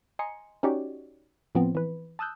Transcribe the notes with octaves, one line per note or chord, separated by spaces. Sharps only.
D#5 G#5 A#5 C6 C#7
C#4 D#4 F#4 G4 C#5 D5
A2 F3 B3 C4
E3 B4
A5 D#6 E6 F#6 G6